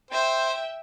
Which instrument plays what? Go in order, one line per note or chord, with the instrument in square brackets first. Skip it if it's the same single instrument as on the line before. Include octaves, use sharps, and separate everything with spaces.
[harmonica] C5 [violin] E5 G5